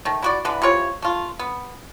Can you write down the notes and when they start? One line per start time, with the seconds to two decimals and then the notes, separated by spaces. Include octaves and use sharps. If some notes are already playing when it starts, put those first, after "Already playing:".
0.05 D#3 A3
0.22 E4 F#4 D5
0.45 D3 E3 B4
0.62 C3 E3 F4 C#5
1.02 A3 F4
1.39 B3